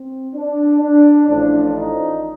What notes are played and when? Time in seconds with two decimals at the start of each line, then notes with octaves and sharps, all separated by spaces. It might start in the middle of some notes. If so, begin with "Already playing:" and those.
Already playing: C4
0.34 D4
0.81 D4
1.26 A1 A2 F3 D4
1.73 D#4